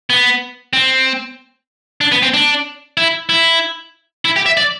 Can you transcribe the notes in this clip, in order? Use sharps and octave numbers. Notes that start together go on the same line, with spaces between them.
B3
C4
D4
B3
C4
D4
E4
E4
E4
G4
E5
D5